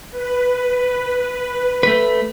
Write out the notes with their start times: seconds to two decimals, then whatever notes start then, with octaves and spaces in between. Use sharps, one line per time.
0.11 B4
1.83 A3 B4